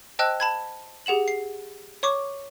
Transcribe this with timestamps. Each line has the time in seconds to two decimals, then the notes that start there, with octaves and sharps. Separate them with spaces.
0.19 C5 D#5 G5 A5 E6 F#6
0.40 A5 B5 G#6
1.06 G4 G#4 F#5 E7 F#7
1.28 C7
2.03 C#5 C#6 D6